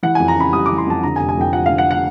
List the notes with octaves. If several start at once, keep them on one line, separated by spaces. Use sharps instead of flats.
E3 F#5
F2 G#5
A#5
C#3 B5
G3 D#6
E3 D6
C6
F2 A5
D3 A#5
G#5
F1
G#5
F2 G5
F3 F#5
D3 F5
F#5
F#5